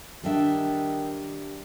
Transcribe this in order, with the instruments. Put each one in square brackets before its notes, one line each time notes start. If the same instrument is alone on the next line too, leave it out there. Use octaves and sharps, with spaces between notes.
[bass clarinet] D#3 [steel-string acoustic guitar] G3 D4 E5